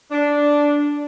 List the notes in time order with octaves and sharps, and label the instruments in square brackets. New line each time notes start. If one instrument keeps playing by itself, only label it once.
[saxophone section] D4